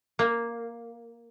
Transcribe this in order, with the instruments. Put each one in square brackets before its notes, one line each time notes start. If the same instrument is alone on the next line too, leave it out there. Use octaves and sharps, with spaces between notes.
[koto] A#3